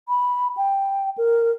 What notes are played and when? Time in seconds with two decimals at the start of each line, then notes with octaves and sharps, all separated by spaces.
0.09 B5
0.57 G5
1.18 A#4